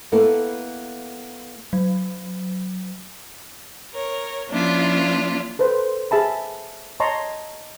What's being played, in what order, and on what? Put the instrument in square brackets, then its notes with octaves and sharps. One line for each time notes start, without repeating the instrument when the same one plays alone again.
[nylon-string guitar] A#3 B3 E4 A4 A#4
[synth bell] F#3
[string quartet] A#4 C#5
F3 A#3 C#4 D4 E4 F4
[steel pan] A4 B4 C5
G#4 E5 A5 B5
C#5 D#5 A5 A#5 C6 C#6